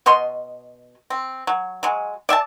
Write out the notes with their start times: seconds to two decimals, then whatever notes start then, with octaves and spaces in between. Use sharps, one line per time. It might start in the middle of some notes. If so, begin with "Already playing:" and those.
0.06 B2 C#5 D#5 C6
1.10 C4
1.47 F#3
1.83 F#3 G#3
2.29 D5 E5 G5 A5